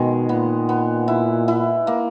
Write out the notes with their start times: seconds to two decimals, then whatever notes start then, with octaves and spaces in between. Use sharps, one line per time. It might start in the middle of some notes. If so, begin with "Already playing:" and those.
Already playing: B2 D#3 G#3
0.29 A#2 B3
0.69 B3
1.08 E4
1.48 E4
1.87 A#3